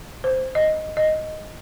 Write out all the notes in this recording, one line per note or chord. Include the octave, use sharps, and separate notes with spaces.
C5
D#5
D#5